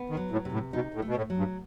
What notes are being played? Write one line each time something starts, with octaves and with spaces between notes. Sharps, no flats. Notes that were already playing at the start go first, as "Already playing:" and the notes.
Already playing: B3
D#3
F#3
A2
C3
A2
B2 D#4
A2
A3
B2
A2
F#3
G2